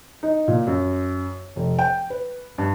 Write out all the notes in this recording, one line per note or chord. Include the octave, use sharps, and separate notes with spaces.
D#4
A#2
F#2
F1
G5
B4
G2